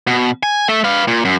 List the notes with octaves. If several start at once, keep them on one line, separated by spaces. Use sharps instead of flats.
B2
G#5
A3 E5
B4 F5
A#2
F#2